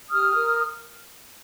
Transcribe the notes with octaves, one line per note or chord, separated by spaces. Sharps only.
G4 D#6 F6
A#4